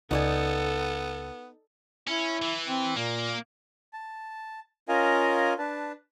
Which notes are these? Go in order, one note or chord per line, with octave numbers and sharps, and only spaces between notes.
C#2 B3 D#4 A4 D5 G#5
C#4 E4
E3
C4
A#2 A#3
A5
C#4 F4 A#4 D#5 F5 G#5
D4 B4 A5